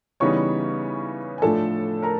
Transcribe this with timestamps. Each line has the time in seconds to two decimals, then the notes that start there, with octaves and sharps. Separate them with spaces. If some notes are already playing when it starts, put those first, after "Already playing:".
0.20 C#3 E3 G3 B3 D#4 C#5 C#6
1.38 G#5
1.42 A2 F3 A3 D4 A4 A5
2.02 A#4 A#5